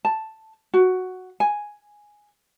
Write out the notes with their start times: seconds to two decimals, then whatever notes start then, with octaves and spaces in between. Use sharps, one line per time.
0.05 A5
0.74 F#4
1.40 G#5